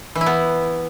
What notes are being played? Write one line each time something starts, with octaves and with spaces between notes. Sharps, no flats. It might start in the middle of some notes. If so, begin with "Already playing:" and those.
E3
E4
B3